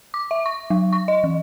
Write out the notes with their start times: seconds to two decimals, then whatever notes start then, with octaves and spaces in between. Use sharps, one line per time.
0.14 D6
0.31 E5
0.46 C#6
0.70 F#3
0.93 C#6
1.08 D#5
1.24 E3